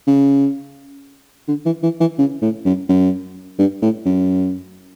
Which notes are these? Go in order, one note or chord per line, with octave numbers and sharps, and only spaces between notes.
C#3
D3
E3
E3
E3
C#3
A2
F#2
F#2
G2
A2
F#2